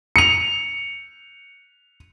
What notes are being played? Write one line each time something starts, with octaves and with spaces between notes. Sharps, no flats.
C#7 F7